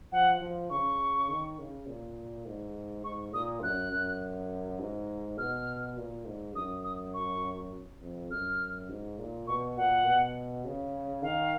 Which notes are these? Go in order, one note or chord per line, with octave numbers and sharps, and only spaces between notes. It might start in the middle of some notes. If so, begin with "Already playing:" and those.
F3 F#5
F3
C#3 C#6
D#3
C#3
A#2
G#2
G#2 C#6
A#2 D#6
F#2 F#6
F#2
G#2
B2 F6
A#2
G#2
F#2 D#6
D#6
C#6
F2
F#2 F6
G#2
A#2
B2 C#6
A#2 F#5
B2
C#3
D#3 F5